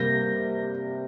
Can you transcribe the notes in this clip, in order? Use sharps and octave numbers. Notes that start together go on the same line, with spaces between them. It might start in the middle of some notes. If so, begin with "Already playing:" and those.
Already playing: C3 G3 A#3 G6 A#6